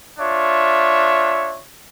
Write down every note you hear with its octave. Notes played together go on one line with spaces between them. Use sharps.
D4 F4 C#5 E5